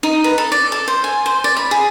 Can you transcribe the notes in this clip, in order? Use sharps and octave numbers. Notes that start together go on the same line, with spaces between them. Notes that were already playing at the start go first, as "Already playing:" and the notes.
D#4
B4
A4
D5
A4
C5
G#5
C5
D5
B5
G#4